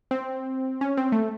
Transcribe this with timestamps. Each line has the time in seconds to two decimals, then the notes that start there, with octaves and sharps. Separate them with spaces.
0.11 C4
0.81 C#4
0.97 C4
1.12 A3